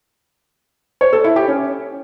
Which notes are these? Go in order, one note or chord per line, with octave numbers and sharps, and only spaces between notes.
C#5
A4
E4
G4
C#4